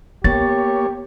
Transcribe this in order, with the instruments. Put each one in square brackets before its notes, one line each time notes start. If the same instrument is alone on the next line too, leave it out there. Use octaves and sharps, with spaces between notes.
[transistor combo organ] A#3 C#5 [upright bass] B3 [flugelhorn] G4 [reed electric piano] A6